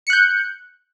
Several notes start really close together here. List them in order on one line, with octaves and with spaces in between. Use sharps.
C#7 F#6 G6